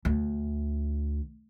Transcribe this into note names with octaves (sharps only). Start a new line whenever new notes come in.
D2